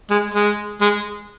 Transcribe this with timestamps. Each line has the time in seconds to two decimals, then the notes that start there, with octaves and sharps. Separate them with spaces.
0.10 G#3
0.34 G#3
0.81 G#3